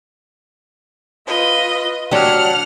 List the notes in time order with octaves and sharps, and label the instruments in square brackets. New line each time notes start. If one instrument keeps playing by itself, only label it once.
[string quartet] F4 B4 D#5
[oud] F#3 D4 G4 [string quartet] F#5 F6